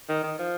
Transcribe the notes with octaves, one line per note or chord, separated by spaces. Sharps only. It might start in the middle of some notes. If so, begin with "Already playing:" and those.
D#3
D#3
F3